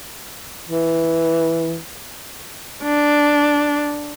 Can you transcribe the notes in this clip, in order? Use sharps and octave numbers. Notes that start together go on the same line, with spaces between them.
E3
D4